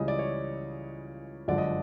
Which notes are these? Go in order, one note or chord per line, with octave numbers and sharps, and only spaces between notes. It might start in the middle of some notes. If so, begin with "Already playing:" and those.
Already playing: C#2 C#3 E3 G3 D#5
D5
C#5
G1 F#2 D3 F3 G#3 D5
D#5